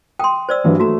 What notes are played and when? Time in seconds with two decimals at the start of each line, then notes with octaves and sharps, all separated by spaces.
0.19 G5 C6 D#6
0.49 C5 D5 E6
0.64 G2 E3 F#3
0.80 A3 F#4 A#5